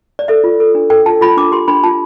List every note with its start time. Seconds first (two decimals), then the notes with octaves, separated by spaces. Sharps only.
0.19 D5
0.28 A4 E5
0.44 F4
0.60 A4
0.75 D4
0.90 A4 G5
1.06 F4 A5
1.21 F4 B5
1.37 D4 D6
1.52 G4 C6
1.68 D4 B5
1.84 F4 A5